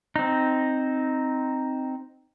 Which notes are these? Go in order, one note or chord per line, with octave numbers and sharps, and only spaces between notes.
C4 D#4